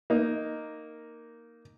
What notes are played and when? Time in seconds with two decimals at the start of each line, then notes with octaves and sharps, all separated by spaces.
0.10 A#3 D#4